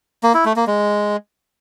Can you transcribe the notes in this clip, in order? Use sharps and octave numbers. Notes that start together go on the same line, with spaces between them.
A#3
E4
A3
A#3
G#3